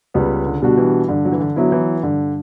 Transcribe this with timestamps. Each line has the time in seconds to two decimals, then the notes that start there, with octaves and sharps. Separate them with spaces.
0.14 C#2 G3 B3
0.47 D3
0.62 B2 G3 D4 F#4
0.77 E3
1.08 G2 D3
1.25 F#3
1.32 E3
1.40 D3
1.56 F#3 B3 E4
1.72 E3
2.03 G2 D3